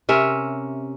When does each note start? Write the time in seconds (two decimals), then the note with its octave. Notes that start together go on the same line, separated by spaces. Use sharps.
0.09 C3 C#4 A#4 E5